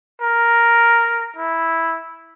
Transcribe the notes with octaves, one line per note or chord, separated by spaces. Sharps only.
A#4
E4